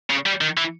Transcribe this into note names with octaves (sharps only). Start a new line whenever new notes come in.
C#3
G3
D#3
E3